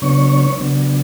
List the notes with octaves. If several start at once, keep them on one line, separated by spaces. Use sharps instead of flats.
C#3 F#3 B3 D4 C#5 C#6
C#3 F#3 B3 D4